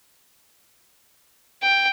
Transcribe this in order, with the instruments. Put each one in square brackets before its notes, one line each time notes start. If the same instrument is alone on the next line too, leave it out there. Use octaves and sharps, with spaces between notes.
[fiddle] G5